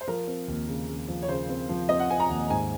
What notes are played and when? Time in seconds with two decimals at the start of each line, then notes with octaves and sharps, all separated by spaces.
0.01 C5
0.07 F3 A#4
0.27 C4
0.48 D#2
0.68 C#3
0.88 C#3
1.08 F3
1.23 C#5
1.28 C#3 C5
1.49 C4
1.69 F3
1.89 C4 D#5
2.00 F#5
2.10 C4 G#5
2.20 A#5
2.30 D#2
2.50 G#2 G#5